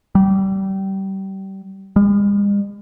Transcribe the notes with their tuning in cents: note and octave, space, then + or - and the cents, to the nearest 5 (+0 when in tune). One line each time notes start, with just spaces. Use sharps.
G3 -25
G#3 -45